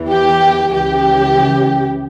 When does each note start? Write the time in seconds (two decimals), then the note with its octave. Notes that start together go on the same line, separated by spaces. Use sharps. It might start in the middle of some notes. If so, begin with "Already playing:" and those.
Already playing: E2 E3
0.10 G4
0.73 C#2 C#3 E3 G4